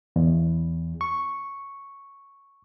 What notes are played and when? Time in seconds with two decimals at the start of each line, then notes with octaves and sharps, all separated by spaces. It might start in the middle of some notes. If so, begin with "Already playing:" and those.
0.16 E2
1.01 C#6